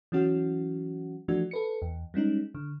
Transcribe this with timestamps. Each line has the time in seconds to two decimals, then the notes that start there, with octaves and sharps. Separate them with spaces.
0.12 E3 F#3 C#4 F#4
1.28 E3 F3 A3 D4 F#4
1.51 A4 B4 C#7
1.82 E2
2.14 G3 G#3 C#4 D#4
2.55 D3